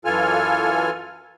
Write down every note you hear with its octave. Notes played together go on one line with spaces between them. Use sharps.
F#2 E3 F4 A4 G#5 F6